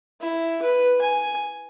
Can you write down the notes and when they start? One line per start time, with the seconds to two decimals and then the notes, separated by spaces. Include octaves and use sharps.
0.21 E4
0.61 B4
1.01 G#5